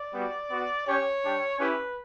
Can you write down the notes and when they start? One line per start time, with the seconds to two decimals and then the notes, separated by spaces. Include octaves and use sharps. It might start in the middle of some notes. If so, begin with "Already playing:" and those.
Already playing: D5
0.14 G3 B3 F#4
0.51 B3 F#4
0.87 C#4 G4 C#5
1.23 G3 D4 G4
1.60 C#4 E4 G4 B4